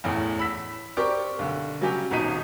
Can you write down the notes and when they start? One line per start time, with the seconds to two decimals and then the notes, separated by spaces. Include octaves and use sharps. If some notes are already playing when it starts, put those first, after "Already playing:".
0.04 A1 E2 A2
0.39 B5 E6 B6
0.97 C4 G4 A#4 D5 C#6 D6
1.39 B1 D3
1.81 C#3 F#3 G3 C#4 G4
2.11 D#1 G#1 B2 D#4 B6 D#7